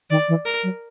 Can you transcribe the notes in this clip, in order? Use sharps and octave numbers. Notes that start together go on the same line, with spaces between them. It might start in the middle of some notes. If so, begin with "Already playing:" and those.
D#3 D5
E3
A#4
F#3